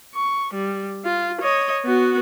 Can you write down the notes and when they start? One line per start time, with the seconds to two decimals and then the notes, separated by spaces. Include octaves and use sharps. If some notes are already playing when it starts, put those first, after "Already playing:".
0.15 C#6
0.54 G3
1.05 F4
1.41 C#5 D#5
1.85 B3 F#4